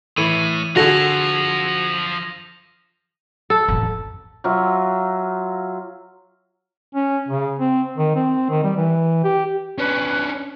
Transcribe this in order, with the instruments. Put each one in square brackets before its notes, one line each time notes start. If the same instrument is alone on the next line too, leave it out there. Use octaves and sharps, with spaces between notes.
[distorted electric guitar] A2 [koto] E3 C#5 [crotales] D#7
[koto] D3 G#4 [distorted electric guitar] F3 A4 [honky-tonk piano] F#4 [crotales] A#6 F7
[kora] A4
[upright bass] A1 F2
[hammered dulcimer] F#3 F4 E5
[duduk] C#4
C#3
C4
D#3
C4
D#3
G3
E3
G4
[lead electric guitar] C#4 D4 [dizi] B4